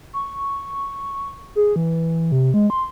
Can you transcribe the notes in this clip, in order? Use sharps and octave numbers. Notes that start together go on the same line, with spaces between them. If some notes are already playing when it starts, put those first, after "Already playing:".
C#6
G#4
E3
C3
G#3
C6